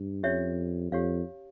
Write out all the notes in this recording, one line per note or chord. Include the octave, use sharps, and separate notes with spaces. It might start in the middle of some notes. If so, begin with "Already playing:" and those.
Already playing: G2
F2 C#4 G4 C#5 E5
F2 G4 C#5 F5